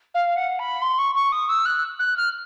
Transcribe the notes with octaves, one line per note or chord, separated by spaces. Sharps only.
F5
F#5
B5
C6
C#6
C#6
D#6
E6
F#6
F#6
F6